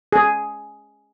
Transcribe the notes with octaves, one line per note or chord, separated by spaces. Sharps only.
G#4